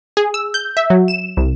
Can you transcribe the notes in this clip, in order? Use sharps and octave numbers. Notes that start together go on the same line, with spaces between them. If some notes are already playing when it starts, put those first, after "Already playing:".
G#4
E6
G6
E5
F#3
E7
C2